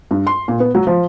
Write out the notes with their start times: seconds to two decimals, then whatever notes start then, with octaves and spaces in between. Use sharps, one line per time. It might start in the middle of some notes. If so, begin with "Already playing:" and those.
0.11 G2
0.27 C6
0.48 A#2
0.60 B3
0.75 F#3
0.87 F3